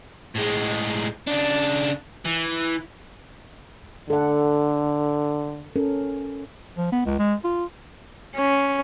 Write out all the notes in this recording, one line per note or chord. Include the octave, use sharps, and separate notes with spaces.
A2 G#3
C#3 D4
E3
D3 A4 F#5
C#4 A4 A#4
F3
B3
C#2
G#3
F4
C#4